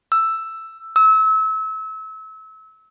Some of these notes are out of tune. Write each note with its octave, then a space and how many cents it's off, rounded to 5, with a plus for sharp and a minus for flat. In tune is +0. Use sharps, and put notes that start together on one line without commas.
E6 +5
E6 -30